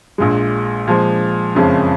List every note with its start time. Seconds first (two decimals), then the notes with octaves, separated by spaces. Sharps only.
0.18 A#1 A#2 G#3
0.87 A#2 F3 G#3
1.55 F#1 F2 C#3 F3 G#3